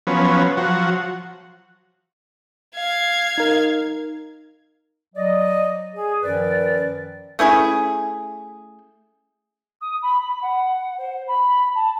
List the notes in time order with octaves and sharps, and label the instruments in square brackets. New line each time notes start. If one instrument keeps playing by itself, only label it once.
[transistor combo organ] F3 F#3 B3 C#4
F3 F#3 F#4
[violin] F5 G#6
[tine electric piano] D#4 A#4
[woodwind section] F#3 D5 D#5
G#4
F#2 D#3 F3 A#4 B4 D5
[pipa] A3 C#4 E4 G#4
[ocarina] D#6
B5
B5
F#5
C5
B5
A5